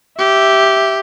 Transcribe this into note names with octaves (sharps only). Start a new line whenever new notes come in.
G4 E5